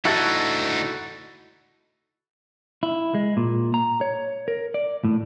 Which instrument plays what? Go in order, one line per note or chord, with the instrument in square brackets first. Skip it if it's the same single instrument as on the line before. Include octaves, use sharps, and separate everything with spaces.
[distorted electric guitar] D2 D#4 [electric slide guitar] E4 F#4 A4
[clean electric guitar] E4
G#3
A#2
A#5
C#5
A#4
D5
A2